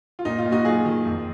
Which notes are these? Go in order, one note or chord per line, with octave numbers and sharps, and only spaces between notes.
F4
A#2 D#4
F4
A#2
D#4 F#4
F#3 F4 G#4
D#3
F2